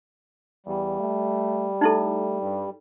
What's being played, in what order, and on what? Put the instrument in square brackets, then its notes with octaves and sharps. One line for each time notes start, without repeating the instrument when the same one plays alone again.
[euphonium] E2 [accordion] G3
[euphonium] A3
[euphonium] A3 [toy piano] D#4 E4 A4
[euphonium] G2